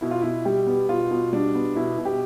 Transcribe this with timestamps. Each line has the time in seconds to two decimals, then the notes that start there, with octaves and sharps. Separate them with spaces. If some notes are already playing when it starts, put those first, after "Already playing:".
0.01 B2 E4
0.11 F4
0.21 B2 E4
0.45 G3 G4
0.67 B3
0.89 B2 F4
1.11 B2
1.33 G3 D4
1.54 B3
1.76 B2 E4
1.98 B2
2.05 G4